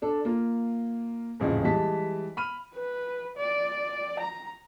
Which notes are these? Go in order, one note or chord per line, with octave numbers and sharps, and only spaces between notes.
D4 A4
A#3 F4
D#1 A1 F2 C#3 D#5
E3 G3 G#3 D#5 A5 B6
B5 F6 D#7
B4
D5
A#5